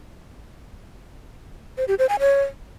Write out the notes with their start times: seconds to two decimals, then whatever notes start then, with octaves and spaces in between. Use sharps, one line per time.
1.78 C5
1.88 G4
1.99 C5
2.09 G#5
2.20 C#5